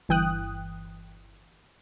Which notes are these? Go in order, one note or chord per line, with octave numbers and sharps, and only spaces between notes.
G1 E3 G5 D#6 F#6